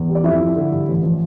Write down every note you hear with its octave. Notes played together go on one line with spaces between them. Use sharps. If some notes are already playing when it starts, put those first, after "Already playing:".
Already playing: E2
G3
D5
F2 E4 E5
F3
D3
G2
A1
F3